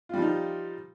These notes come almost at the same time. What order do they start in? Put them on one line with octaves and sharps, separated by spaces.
F4 G3 F3 D#4 G4